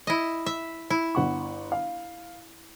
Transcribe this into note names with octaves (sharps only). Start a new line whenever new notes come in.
E4 D#5
E5
E4
G1 F#5 C#6
F5